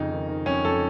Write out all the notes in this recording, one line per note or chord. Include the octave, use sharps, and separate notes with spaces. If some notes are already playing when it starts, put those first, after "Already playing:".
Already playing: F2 C#3 D#4
D#3
D#3
F2 C#4
F2 A4